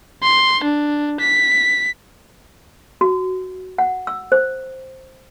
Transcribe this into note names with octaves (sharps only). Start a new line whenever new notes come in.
C6
D4
B6
F#4
F#5
E6
C5